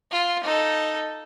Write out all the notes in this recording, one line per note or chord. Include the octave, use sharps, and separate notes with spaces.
F4
D#4 A4